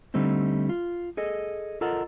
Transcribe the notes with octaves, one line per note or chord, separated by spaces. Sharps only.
D3 G3 A3 C4 D#4
F4
G#4 A4 D#5
F4 A4 A#4 D#5 F#5